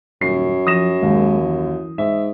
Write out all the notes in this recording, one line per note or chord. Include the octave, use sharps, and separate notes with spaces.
D#1 F#2 C7
F3 D#6 A#6 E7
D#2 G#3
E3
G#2 E5